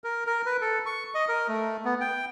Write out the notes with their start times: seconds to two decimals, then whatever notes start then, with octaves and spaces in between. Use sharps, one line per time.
0.04 A#4
0.27 A#4
0.46 B4
0.61 A4
0.86 C#6
1.14 D#5
1.28 A#4
1.48 A3
1.85 B3
2.01 G5